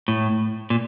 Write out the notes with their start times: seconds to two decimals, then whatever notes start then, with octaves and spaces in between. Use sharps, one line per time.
0.08 A2
0.70 A#2